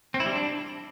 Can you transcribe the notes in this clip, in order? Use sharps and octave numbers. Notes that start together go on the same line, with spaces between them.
C4
E4
G3
D4